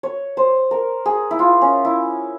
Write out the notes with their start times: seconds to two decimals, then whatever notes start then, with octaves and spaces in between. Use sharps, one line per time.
0.03 C#5
0.37 C5
0.71 A#4
1.06 G#4
1.31 E4
1.39 F4
1.61 C#4
1.85 E4